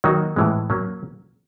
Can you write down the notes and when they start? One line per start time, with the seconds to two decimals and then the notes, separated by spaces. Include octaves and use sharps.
0.04 D#3 F#3 A#3 D#4 F#4
0.36 A2 E3 G#3
0.70 F#3 A#3 C#4